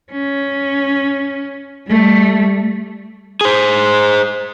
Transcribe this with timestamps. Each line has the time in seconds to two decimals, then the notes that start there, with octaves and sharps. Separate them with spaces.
0.12 C#4
1.87 G3 A3
3.41 G#4 C5